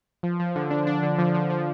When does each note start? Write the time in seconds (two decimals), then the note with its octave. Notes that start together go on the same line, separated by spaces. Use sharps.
0.23 F3
0.40 F3
0.56 D3
0.71 D4
0.87 D4
1.03 D3
1.18 F3
1.34 F3
1.50 F3